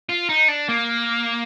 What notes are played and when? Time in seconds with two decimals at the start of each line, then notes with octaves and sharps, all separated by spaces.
0.09 F4
0.29 D#4
0.48 D4
0.69 A#3